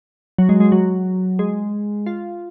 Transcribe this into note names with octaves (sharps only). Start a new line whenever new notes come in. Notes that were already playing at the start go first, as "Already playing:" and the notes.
F#3
G#3
G#3
F#3
G#3
F4